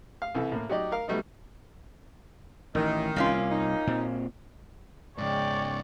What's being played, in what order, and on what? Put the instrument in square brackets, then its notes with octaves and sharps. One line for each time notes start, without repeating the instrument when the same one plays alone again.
[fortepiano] F5
C2 E3 A4
A2 A#3
F#3 D#4 G4 D5 D#5
A#4 F5
F#3 G3 A3 B3 D#4
[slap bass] A1 [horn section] D#3
[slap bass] C2 [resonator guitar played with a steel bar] A#3 C#4 F4
[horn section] D#4
[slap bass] A#2 C4
[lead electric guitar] G#2 C#3 [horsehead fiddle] G#3 G5 [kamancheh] C#5 D5